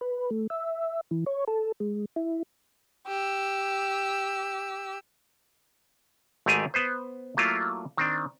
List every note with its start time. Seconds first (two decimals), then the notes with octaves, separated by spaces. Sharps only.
0.01 B4
0.31 A3
0.50 E5
1.11 E3
1.26 C#5
1.48 A4
1.80 G#3
2.16 E4
3.07 G4 E6
6.46 G#1 G#2 A3 G4 G#4 G#5
6.74 B3 B4 C5
7.37 F#3 A3 A#3 E4 F4
7.97 D#3 C4 D4